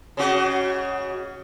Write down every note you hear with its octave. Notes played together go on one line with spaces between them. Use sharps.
C#3 F#4 D#5